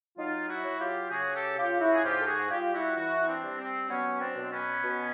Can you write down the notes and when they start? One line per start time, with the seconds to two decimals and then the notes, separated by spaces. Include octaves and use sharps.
0.18 F#3 D#4 F4
0.49 E4 F#4
0.64 F#3
0.79 F4 G4
1.11 C#3 F#4 G#4
1.34 G4 A4
1.57 C#3 F4 G4
1.80 E4 F#4
1.92 G#4
2.04 G#2 F4 G4
2.20 A4
2.26 F#4 G#4
2.50 G3 F4 G4
2.73 E4 F#4
2.96 E3 E4 F#4
3.27 C4 D4
3.43 G3
3.59 C4
3.89 F#3 B3 C#4
4.20 C4 D4
4.36 B2
4.43 C4
4.51 B3 C#4
4.82 B2